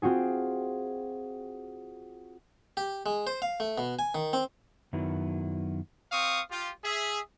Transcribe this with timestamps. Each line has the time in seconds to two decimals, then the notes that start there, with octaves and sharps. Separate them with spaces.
0.02 C4 F4 F#4 G#4
2.77 G4
3.06 G#3
3.27 C5
3.42 F5
3.60 A3
3.78 B2
3.99 G#5
4.15 D#3
4.33 C4
4.93 F#2 D#3 F#3 B3 E4
6.12 C4 F5 C#6 D#6
6.51 F4 G4
6.83 G#4 E5